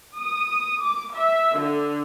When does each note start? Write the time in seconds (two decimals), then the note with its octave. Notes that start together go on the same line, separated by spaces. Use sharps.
0.17 D#6
0.82 D6
1.15 E5
1.58 D3